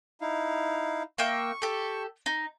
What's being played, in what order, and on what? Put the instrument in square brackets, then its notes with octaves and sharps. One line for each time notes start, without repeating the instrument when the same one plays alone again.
[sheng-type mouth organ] D#4 E4 F5
[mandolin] A#3 E5 G5 [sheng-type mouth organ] C#6
[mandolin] G4 A4
D#4